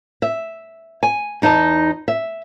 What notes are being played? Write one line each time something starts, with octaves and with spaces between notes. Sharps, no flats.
E5
G#5
E2 D#4 D#5 A5
E5